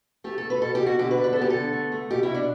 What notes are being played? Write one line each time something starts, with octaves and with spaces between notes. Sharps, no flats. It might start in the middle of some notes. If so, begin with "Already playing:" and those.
A3 G4
A4
A3
B4
B2 A4
G4
B2
F#4
D3 G4
B4
G3
B4
B3 A4
G4
D3 A4
A3
A3
B2 G4
E4
B2
D4